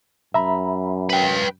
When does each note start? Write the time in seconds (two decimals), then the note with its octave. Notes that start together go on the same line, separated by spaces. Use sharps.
0.34 F#2 E5 A#5 B5
1.10 B4 G5